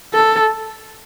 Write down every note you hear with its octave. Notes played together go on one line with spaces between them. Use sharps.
A4